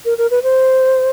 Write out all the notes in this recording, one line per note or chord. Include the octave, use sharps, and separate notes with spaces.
A#4
A#4
B4
C5